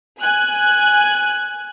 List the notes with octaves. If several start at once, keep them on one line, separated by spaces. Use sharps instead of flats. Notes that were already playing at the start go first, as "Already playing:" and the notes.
G#5 F#6